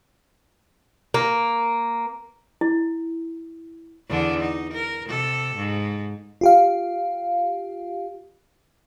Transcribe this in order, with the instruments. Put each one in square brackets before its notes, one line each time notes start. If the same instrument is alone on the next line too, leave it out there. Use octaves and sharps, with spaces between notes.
[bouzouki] A#3
[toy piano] E4
[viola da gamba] E2 D3 D4
D#4
A#4
C3 A4
G#2
[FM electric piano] F4 G4 F5